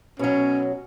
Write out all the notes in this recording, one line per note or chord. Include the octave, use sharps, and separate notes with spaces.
B2 F#3 C#4